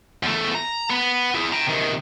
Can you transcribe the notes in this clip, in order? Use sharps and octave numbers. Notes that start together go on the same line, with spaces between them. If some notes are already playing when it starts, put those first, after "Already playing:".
E2 A3
A#5
B3
E4 G#4
G5 A#5
C3 D#3